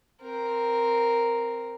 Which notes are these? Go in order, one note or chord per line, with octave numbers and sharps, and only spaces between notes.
C4 A#4